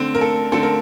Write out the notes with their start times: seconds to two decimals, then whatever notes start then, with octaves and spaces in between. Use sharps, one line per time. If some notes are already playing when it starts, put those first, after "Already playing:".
Already playing: D3 A3 C4
0.15 A#4
0.21 A4
0.52 D3 A3 C4 A4
0.63 A#4